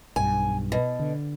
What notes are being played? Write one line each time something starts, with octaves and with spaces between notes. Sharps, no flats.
B1 G2 G#5
B2
D3